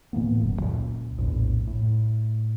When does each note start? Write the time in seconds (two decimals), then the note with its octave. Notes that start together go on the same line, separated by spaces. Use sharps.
0.13 A2 E3 A#3 B3
0.42 D#1 F#2 D3 F#3
0.60 C#2 A#2
1.18 A#1 E2 A2
1.67 A2